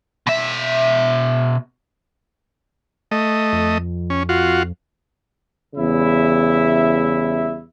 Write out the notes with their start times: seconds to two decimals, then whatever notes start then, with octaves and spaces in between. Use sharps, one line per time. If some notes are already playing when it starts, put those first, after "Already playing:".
0.27 B2 E5
3.11 A3 D#5
3.53 F2
4.10 C#4
4.29 F4 F#4
5.75 E2 C#3 G3 E4 E5